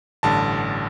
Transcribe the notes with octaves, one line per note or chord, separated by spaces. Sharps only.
A1 G2 D3 A5